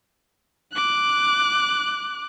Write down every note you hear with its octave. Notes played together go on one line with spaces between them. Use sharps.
D6 F#6